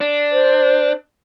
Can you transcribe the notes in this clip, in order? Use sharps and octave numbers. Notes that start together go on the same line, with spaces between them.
D4
C5